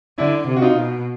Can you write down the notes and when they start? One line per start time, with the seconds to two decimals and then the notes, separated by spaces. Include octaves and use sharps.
0.18 D3 D4 E4
0.47 C3
0.56 F#4
0.62 D#4 F4
0.76 B2